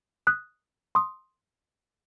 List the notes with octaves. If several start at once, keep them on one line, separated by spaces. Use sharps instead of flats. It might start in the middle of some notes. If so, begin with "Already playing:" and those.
D#6 F#6
C6 D#6